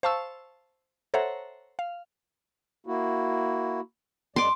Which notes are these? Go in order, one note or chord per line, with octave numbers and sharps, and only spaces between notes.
C5 F5 A5 C#6 E6
A4 C5 C#5 E5 F#5 A#5
F5
A#3 E4 F#4
F#2 G#3 D5 C6 D6